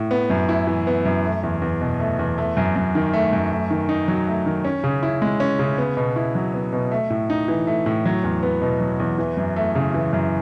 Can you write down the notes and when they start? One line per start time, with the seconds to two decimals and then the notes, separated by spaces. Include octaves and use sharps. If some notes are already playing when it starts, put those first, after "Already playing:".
Already playing: A2
0.11 B3
0.30 F#2
0.49 E4
0.67 E3
0.87 B3
1.05 F#2
1.24 A3
1.43 E2
1.62 E2
1.81 B2
2.00 A3
2.19 E2
2.38 A3
2.57 F#2
2.76 F#2
2.95 D#3
3.13 A3
3.33 F#2
3.52 A3
3.71 D#3
3.89 D#4
4.08 F#3
4.27 A3
4.46 D#3
4.65 C#4
4.84 C#3
5.03 E4
5.22 G#3
5.40 C#4
5.59 C#3
5.78 B3
5.97 B2
6.16 E4
6.35 F#3
6.54 B3
6.72 B2
6.92 A3
7.10 A2
7.30 D#4
7.48 E3
7.67 A3
7.86 A2
8.06 F#3
8.24 E2
8.43 B3
8.62 B2
8.81 F#3
9.00 E2
9.18 E3
9.37 F#2
9.56 A3
9.75 C#3
9.94 E3
10.13 F#2